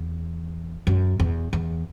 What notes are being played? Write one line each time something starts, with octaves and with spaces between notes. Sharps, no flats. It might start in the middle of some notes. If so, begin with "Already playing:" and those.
Already playing: E2
F#2
E2
E2